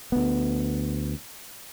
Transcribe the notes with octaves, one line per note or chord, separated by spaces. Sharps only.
D2 B3